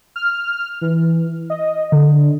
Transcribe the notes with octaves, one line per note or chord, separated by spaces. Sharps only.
F6
E3
D#5
D3